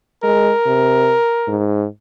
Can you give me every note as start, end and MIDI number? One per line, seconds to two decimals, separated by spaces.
0.23 0.52 56
0.23 1.66 70
0.66 1.16 48
1.48 1.86 44